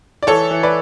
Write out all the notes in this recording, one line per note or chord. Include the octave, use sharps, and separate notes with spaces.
D5
E3 A4 C#5
E3
B4 D5